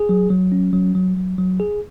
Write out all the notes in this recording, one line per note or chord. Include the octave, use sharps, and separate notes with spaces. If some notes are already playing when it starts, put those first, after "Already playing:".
Already playing: G#4
F#3
F#3
C#4
F#3
F#3
F#3
F#3
G#4